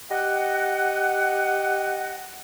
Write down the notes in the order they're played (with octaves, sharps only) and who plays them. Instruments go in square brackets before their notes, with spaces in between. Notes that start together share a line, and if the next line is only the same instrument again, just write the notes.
[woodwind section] G4 D#5 F#5